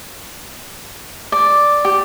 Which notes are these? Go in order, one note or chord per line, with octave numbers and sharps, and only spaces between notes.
D5
G4